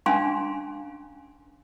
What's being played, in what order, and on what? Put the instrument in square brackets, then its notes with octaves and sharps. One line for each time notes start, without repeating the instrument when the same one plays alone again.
[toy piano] C#4 D4 F5 G#5 A#5 C6